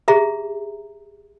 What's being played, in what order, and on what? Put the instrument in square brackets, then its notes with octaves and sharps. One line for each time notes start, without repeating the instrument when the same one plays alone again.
[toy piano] G4 G#4 E5 A#5